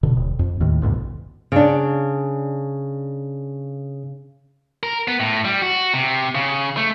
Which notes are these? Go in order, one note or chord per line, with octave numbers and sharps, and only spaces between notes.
B2 D3
D#1
F2
D#2 A2 D#3
A1 D2 G2 B2
C#3 D4
A#4
B3
A2
G3
F#4
C3
C#3
A3